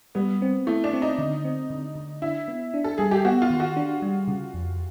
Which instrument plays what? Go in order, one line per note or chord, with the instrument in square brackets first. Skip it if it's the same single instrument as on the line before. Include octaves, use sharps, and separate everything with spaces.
[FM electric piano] G3 [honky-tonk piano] B3
[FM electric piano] C4
[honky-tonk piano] A3 [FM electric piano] E4
[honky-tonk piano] D4
[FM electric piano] C4
[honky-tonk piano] D#4
[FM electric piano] D3
C4
D3
D3
[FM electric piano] D4 [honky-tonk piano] E4
[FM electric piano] B3
D4
[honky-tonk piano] A4
[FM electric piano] G3 [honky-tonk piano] G#4
[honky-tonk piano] G4
[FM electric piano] B3 [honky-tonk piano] F#4
[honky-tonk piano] F4
[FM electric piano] D#3
[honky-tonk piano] F#4
[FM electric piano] D4
G3
C#3
F2